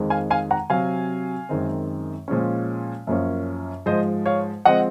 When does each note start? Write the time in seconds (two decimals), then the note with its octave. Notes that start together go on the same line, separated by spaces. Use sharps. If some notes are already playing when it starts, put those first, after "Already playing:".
Already playing: F2 D#3 G#3
0.10 F5 G#5
0.30 F5 G#5
0.51 F#5 A#5
0.69 C3 F#3 C4 F5 G#5
1.49 F#2 D#3 G#3 C4
2.28 A#2 F3 G#3 C#4
3.07 F#2 F3 A#3 C#4
3.86 G#2 F3 G#3 C5 D#5
4.26 C#5 F5
4.65 F3 G#3 C4 D#5 F#5